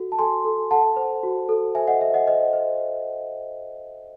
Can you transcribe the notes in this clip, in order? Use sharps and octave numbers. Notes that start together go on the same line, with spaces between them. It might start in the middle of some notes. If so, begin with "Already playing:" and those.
Already playing: F#4 A4
A5
A4 G#5 C6
A4
A4 F#5 A5
C5
F#4
A4
C5 E5 G#5
D#5 F#5
C5 E5
D#5 F#5
C5 D#5
C5